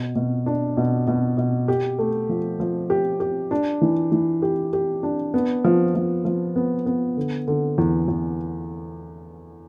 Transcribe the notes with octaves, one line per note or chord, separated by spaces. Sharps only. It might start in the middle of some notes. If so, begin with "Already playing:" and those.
Already playing: B2
B2
D4
B2
B2
B2
G4
A3
F3
F3
G4
G4
D4
E3
E3
G4
G4
D4
B3
F3
F3
F3
B3
B3
D3
D3
E2
E2